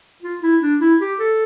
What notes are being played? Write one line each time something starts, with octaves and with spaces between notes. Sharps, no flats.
F4
E4
D4
E4
G4
A4